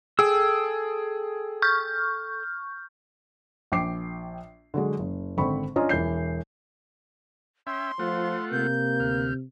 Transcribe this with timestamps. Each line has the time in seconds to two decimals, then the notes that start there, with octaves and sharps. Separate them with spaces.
0.19 G#4 A4 G5 E6
1.62 C#6 F6 G6
3.72 A#1 G5 D6 C7
4.74 D3 F#3 G#3
4.99 F#1
5.37 G#1 D3 C4 B5 C#6
5.76 C#4 D4 F4 D#5 A#5
5.89 E1 E3 G6 C7
7.67 C#4 E5 G5 C6
7.99 F3 A3 F4 F#5
8.52 C3 A#3 G6
9.00 D2 F6